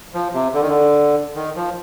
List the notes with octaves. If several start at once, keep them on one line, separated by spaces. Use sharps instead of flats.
F3
C3
D3
D#3
D3
D#3
F3